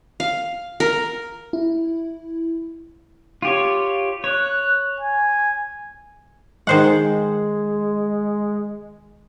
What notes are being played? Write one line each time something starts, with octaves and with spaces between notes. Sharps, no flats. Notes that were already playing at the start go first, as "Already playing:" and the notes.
F5
A#4
E4
F4 G4 C#5
C#5 F#6
G#5
D#3 G#3 C5 F#5